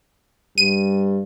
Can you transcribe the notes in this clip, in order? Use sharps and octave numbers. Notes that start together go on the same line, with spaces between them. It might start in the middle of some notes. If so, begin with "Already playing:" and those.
G2 D#7